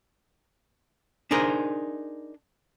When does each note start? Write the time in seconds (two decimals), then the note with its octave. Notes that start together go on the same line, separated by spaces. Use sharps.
1.31 D4 D#4 G#4 A#4 C5